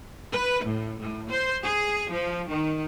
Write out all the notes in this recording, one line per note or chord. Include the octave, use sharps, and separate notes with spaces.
B4
A2
A2
C5
G#4
F3
D#3